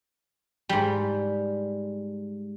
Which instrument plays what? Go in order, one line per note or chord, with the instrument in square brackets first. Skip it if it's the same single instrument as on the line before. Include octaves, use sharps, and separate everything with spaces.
[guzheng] G#2 G3